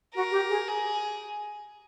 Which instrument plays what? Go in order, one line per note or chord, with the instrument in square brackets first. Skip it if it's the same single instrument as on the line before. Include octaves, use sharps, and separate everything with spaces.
[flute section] F#4 [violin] A#4
[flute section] G4
G#4
[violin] G#4